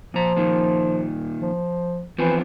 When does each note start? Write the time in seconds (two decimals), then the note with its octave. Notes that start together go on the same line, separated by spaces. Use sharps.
0.14 A#2 F3 A#5
0.37 A#2 D#3
1.42 F3
2.18 E3 F3 B3 C4